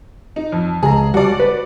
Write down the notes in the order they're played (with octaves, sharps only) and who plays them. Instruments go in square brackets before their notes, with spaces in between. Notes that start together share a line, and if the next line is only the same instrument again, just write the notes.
[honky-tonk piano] D#4
F2
[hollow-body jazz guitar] C#2 A#5 [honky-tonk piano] G#4
[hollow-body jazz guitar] G3 [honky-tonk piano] F#4 D5
[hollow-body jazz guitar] B4